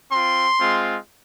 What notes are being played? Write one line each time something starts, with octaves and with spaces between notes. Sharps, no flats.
C4 F4 C6
G#3 C4 F4